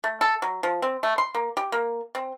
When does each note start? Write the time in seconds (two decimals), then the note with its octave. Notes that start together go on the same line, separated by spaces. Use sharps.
0.04 A3
0.21 A4
0.42 F#3
0.63 F3
0.82 C4
1.03 A3
1.18 C6
1.35 A#3
1.57 G4
1.72 A#3
2.15 C4